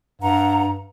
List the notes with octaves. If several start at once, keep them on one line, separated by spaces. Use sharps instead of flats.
G2 F#5 A#5